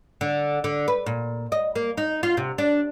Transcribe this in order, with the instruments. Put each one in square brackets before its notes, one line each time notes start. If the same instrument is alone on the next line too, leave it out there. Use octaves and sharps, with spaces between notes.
[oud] D3
D3
B4
A#2
D#5
A#3
D#4
F4
C3
D4